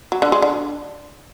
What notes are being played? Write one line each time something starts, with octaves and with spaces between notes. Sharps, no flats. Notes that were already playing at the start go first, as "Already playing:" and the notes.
F#3
D3
G#3
D3